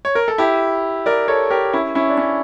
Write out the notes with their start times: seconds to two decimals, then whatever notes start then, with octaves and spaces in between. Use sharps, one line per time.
0.05 C#5
0.15 A#4
0.28 A4
0.38 E4 G4
1.06 A#4 D5
1.28 A4 C#5
1.50 G4 A#4
1.73 C#4 E4
1.95 C#4 E4
2.09 D4
2.18 C#4